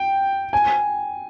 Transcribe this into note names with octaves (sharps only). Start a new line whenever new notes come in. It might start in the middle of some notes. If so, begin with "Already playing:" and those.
Already playing: G5
G#5